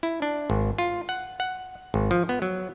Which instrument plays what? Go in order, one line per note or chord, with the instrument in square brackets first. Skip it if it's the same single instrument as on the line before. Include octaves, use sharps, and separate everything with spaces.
[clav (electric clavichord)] E4
D4
G#1
F4
F#5
F#5
G#1
F3
B3
F#3